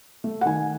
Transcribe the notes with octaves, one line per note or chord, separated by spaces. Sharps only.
A3
F#5
D#3 G#5